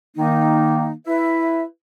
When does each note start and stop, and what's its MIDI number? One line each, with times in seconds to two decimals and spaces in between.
0.17 0.93 51
0.17 0.93 58
0.17 0.93 63
1.06 1.62 64
1.06 1.62 71
1.06 1.62 76